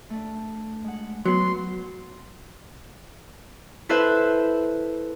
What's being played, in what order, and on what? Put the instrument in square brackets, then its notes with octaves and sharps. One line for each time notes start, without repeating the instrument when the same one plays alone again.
[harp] A3 D4
G#3 F#5
[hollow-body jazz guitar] F#3 B3 [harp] F#4 [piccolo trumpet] C6
[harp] E4 A4 B4 C5 E5